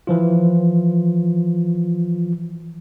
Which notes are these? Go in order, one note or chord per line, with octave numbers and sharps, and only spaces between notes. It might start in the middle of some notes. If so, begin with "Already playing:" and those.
E3 F3 F4